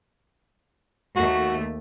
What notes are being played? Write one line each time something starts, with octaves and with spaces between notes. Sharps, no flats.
D#2 A3 F#4